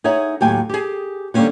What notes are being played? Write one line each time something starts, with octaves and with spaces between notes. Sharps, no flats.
D#4 G#4 C#5 E5 F#5
D#2 A2 F#3 G4 G5 G#5
G4 G#4
D3 G3 A#3 C4 C#4 F#4